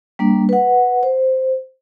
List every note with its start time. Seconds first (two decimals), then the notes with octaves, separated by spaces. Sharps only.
0.19 G3 A#3 D4
0.49 B4 F#5
1.03 C5